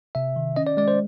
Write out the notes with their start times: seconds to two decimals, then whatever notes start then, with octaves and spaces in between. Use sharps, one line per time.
0.15 C3 E5
0.36 D#3
0.56 C#4 D#5
0.67 D5
0.77 G#3 D5
0.88 C5